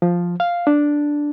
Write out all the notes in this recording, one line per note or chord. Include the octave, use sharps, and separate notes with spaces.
F3
F5
D4